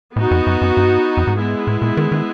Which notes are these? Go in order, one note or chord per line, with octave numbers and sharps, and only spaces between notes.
A2 B3 D#4 F#4
F2
F#2
F#2
G2
F2
G#2
G#3 B3 E4
A2
A#2
D#3
D#3